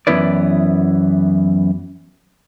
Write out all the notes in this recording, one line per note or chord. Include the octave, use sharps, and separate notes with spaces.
F#2 E3 B3 E4 B4 D5